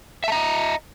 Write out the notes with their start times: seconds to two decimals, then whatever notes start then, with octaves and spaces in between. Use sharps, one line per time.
0.24 E5
0.28 A5
0.32 A#5
0.36 D#5